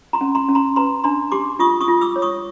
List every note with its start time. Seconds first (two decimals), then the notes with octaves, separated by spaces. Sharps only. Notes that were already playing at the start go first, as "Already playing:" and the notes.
0.13 A#5 C6
0.21 C#4
0.35 A#5 C6
0.49 C#4
0.55 A#5 C6
0.76 B4 A#5 C6
1.04 D4 A#5 C6
1.32 G4 C6 D6
1.59 F4 C#6 D#6
1.81 C#6 D#6
1.88 F4
2.01 D6 E6
2.16 C#5
2.22 C#6 D#6